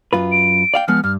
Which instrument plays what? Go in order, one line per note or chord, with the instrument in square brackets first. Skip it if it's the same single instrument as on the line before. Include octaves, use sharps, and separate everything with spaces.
[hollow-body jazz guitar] F#2 F4 B4
[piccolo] D7
[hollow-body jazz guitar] D5 F5 G5
[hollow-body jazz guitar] F3 G#3 B3 [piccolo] F6
[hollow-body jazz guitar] G2 [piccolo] F6